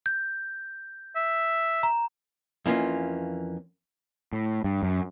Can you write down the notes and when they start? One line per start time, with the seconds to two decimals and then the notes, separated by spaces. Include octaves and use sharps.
0.06 G6
1.15 E5
1.83 A#5
2.66 F2 E3 A#3 C#4 F4
4.33 A2
4.64 G2
4.83 F#2